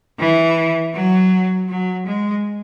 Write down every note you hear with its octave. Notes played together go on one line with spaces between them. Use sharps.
E3
F#3
F#3
G#3